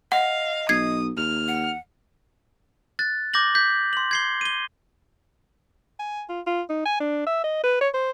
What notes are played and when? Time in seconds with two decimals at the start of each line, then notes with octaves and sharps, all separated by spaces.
0.12 D#5 F5 F#5
0.69 B1 D#6 G#6 C7
1.17 D#2 F6
1.48 F#5
2.99 F#6 A6
3.34 D6 G6 A#6 F#7
3.55 G6 B6
3.93 C6 F#7
4.11 G#6 C7 G7
4.41 D#7 G7
5.99 G#5
6.29 F4
6.46 F4
6.69 D#4
6.86 G#5
7.00 D4
7.26 E5
7.44 D#5
7.64 B4
7.81 C#5
7.94 C5